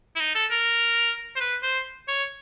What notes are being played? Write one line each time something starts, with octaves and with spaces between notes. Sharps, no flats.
E4
D#4
A4
A#4
C5
B4
C5
C#5